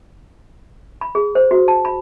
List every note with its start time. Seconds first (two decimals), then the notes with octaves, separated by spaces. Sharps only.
1.01 B5
1.15 G#4
1.35 C5
1.51 F#4
1.68 A5
1.85 B5